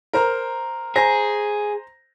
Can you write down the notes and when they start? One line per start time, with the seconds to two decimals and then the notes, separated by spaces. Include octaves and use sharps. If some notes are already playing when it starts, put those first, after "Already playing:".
0.13 A#4 C5 A#5
0.96 G#4 C5 A#5 A#6